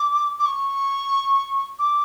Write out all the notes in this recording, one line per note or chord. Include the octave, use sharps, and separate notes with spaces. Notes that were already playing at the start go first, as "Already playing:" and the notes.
Already playing: D6
D6
C#6
D6